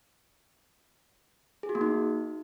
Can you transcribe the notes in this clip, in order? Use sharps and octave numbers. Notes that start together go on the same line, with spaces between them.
G#4
F#4
A#3
D#4